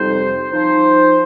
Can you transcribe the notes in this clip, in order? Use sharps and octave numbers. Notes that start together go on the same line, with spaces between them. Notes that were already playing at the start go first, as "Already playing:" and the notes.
Already playing: F2 C3 G3 D#4 C5
F3 D#4 C5